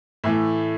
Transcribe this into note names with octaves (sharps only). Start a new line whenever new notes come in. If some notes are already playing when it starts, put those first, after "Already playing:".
A2 E3 A3